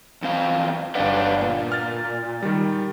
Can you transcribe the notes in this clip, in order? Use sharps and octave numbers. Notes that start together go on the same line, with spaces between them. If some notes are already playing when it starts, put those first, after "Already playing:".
E2 C4 F5
G1 D4 B4 D5 F5 F#5
A#2
F6 A6
D#3 G3